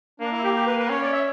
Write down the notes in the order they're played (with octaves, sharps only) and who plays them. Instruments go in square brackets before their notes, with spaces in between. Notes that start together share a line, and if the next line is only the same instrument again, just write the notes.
[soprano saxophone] A#3 [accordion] D4
[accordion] E4
G4
G4
B4
B4
[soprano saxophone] C#4 [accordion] C#5
[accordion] D5
E5